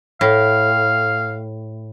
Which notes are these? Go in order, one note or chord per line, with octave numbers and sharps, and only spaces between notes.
A2 F5